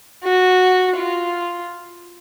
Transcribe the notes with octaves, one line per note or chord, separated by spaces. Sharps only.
F#4
F4